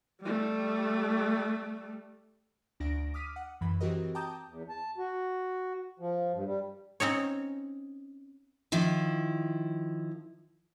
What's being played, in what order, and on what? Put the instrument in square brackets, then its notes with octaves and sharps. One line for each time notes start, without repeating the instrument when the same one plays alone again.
[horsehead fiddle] G3 A3
[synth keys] D2 D4 A#6 D7
D6 D#6 F6 B6 D#7
F#5
F#2 E3 B5
E3 C4 F#4 G4 A#4 D#5
G5 A5 A#5 D6 D#6 G6
[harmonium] E2
A5
F#4
F3
G2
G3
[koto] C4 C#4 D#4 C#5
[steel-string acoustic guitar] D#3 F3 E4